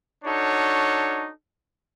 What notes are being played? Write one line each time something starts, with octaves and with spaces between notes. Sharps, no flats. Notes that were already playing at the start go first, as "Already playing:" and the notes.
D4 D#4 F#4 A4 C#5